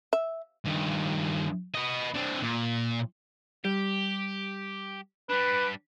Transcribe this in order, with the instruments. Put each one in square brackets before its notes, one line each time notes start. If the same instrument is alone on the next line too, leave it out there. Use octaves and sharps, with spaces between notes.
[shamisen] E5
[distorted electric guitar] G2 D#3
B4 D#5
C4 D4
A#2
[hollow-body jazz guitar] G3 [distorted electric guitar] G4
[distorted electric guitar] G3 D4 [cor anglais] B4